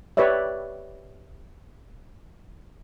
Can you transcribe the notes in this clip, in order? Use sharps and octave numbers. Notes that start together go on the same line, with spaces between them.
G4 B4 C#5 D5 E5